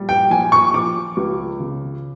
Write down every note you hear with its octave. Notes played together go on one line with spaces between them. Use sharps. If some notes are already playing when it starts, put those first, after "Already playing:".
Already playing: A#1 G3
G5
A#1 G#5
C#6
F3 D6
C#2
C#3